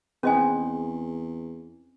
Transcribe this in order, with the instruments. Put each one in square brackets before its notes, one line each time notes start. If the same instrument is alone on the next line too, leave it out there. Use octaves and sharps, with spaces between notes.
[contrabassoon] E2 [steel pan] C4 G#4 B4 [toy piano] C#4 D#5 G#5